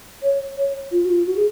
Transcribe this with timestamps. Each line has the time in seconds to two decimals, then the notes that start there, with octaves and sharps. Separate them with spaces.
0.23 C#5
0.57 C#5
0.92 F4
1.05 F#4
1.10 F4
1.27 F#4
1.36 G#4